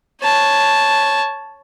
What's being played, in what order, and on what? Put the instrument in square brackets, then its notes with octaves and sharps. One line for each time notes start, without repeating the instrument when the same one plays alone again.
[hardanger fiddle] C#5 A5